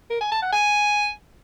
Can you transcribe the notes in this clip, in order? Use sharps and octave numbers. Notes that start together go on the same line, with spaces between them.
A#4
G#5
A5
F#5
G#5